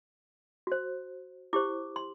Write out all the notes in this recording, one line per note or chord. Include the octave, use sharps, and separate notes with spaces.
F#4 C5
E4 G4 C5 D6
C6